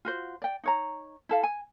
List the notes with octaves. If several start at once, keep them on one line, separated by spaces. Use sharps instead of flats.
F4 F#4 C5
D5 G5
D#4 C#5 A#5
E4 A4 F5
G#5